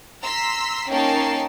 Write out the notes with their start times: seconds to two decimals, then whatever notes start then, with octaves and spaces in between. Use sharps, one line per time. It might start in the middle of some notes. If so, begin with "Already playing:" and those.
0.23 A#5 C6 E6 B6 C7
0.89 A#3 C#4 D#4 G5 A5 C7